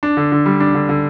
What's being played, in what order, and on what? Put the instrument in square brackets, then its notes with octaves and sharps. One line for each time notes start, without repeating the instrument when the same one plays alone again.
[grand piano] D4
D3
D3
G3
D4
D3
D3